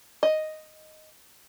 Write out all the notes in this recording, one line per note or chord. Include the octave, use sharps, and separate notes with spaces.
D#5